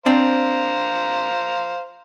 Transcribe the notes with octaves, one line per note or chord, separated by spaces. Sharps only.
C4 D4 C5 F5 A#5